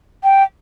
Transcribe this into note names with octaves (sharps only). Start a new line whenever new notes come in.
G5